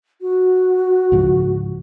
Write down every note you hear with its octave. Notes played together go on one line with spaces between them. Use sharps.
F#4
C#2 G#2 F3